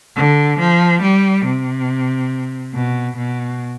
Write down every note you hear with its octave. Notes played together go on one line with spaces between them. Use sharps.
D3
F3
G3
C3
B2
B2